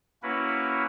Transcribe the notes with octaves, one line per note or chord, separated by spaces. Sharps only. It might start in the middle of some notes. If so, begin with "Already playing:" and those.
A#3 C#4 E4 F#4 B4